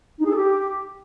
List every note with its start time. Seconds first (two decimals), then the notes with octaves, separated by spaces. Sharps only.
0.19 D#4
0.24 G#4
0.29 A4
0.35 G4